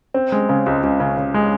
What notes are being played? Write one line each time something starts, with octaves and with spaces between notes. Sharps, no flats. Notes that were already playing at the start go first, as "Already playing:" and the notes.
C4
G#3
C#3
C#2
C#2
C#3
C#3
G#3